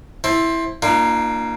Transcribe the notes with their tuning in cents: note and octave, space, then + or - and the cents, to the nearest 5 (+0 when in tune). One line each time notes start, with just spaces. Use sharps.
C4 +15 E4 +0 A5 +0
A#3 +5 D4 +35 F4 -35